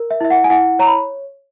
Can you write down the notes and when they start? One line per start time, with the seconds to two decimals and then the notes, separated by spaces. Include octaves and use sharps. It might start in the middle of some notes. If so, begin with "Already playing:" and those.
Already playing: A#4
0.10 E5
0.21 E4 E5
0.30 F#5
0.44 G#5
0.50 E4 F#5
0.79 C#5 A#5
0.87 B5